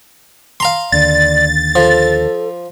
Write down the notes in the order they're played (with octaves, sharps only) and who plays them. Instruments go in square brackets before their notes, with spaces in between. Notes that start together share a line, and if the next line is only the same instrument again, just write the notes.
[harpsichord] F5 A#5 C6
[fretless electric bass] D#2 D3 [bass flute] D5 [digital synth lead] A6
[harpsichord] F3 [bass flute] A4